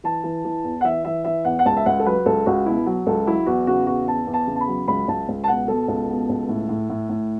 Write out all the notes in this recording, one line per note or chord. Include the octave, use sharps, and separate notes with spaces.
E3 A5
E3
E3
E2
F#5
E3 E5
E3 E5
E3 E5
E2 F#5
F#5
C#2 A5
E5
C#2 F#5
A4
F#3 B4
C#2 A4
C#2 F#4
B2 E4
F#3
C#2 A4
F#3 E4
E2 F#4
C#3 F#4
E2 F#4
E2 A5
E2
A5
C#3
A5
B5
F#3
C#2 B5
C#2 A5
C#2
A5
B2 F#5
B2 A4
C#2
B2
C#2
A2
A2
A2
A2